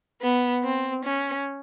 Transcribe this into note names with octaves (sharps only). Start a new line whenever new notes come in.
B3
C4
C#4